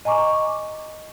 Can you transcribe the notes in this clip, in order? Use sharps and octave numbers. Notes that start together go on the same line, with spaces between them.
D#5 G#5 A#5 C#6 D6